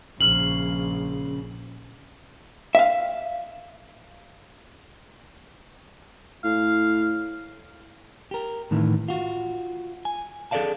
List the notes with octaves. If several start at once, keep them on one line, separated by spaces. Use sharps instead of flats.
A#1 C#3 F6 F#7
E5 F5
A2 F5
G4 A#4
A2 D#3 E3
F4 F#4
G#5
G#4 A4 C#5 D5 F5 A5